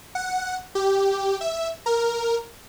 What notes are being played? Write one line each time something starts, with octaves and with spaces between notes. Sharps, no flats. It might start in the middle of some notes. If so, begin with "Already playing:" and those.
F#5
G4
E5
A#4